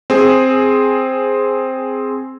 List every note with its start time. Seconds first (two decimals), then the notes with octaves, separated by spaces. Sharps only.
0.10 C4 G#4